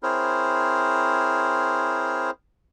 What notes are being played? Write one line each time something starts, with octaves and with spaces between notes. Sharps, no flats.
C4 E4 G#4 A#4 C5 C#5